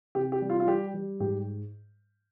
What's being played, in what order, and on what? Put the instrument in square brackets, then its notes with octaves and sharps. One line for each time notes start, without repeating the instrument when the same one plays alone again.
[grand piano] C3 G4
G4
G3
F4
F4
G3 G4
G3
G#2 G4